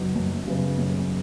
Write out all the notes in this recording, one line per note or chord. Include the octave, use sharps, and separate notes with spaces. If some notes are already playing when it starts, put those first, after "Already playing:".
Already playing: F#2 C#3 F#3 B3 D#4
F#2
C#3 F#3 B3 D#4
F#2